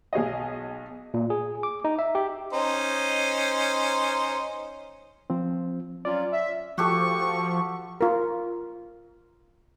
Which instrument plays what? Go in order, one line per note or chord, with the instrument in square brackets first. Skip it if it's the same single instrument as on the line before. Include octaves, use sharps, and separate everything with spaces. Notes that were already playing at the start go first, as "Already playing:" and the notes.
[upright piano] B1 G#4 C#5 D#5
[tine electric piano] A#2
G#4
D6
D#4
E5
G4
[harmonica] C#4 D#4 C5
[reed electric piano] F3 C4
[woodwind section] F#3 C#4 F4 [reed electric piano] D5
[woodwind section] E5
[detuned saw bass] F3 [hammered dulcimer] F#4 G4 A4 [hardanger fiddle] C#6
[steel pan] F4 A#4